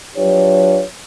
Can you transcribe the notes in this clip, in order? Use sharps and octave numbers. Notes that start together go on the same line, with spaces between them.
F#3 D4 F4 G4 B4 C#5